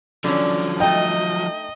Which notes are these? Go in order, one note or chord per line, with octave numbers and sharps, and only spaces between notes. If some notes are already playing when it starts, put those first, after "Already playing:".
D3 F3 F#3 C#4
A3 D#4 D#5 G5